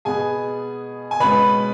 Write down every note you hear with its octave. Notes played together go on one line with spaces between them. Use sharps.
B2 B3 G#4 G#5
G#5
B2 G#3 C#4 B4 B5